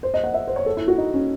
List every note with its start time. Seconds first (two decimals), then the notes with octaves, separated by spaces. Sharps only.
0.03 C5
0.14 D#5
0.24 F#5
0.34 E5
0.47 C5
0.56 C#5
0.66 A4
0.77 E4
0.88 F#4
0.98 D#4
1.14 C#4